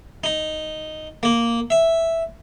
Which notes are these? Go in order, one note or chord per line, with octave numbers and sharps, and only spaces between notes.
D#4
A#3
E5